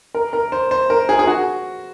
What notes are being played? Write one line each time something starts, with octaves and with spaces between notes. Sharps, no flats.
A#4
A#4
C5
C5
A#4
G#4
G#4
F#4